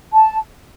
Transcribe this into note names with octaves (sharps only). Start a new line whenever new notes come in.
A5